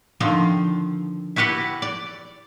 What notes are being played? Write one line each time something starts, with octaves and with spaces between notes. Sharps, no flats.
D3 D#3 F3 C4
E4 F#4 G4 B4 F#5
D5